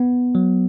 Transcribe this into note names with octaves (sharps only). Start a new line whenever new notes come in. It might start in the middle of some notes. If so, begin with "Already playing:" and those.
Already playing: B3
F#3